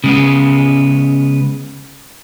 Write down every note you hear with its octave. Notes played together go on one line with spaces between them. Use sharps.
C#3 G#3 B3